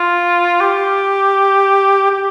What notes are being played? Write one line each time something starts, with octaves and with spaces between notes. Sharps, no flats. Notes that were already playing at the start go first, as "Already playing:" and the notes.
Already playing: F4
G4
G4